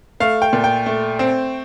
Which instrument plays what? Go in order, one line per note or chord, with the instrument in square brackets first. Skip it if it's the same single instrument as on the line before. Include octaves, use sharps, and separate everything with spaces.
[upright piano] A3 F5
G5
A#2
G5
A3
C4